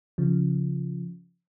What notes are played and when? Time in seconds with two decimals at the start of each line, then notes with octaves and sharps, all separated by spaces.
0.18 C#3 F3